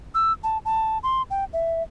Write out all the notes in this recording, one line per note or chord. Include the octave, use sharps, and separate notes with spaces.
E6
A5
A5
C6
G5
E5